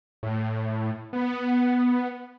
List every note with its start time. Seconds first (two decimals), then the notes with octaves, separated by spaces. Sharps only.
0.23 A2
1.13 B3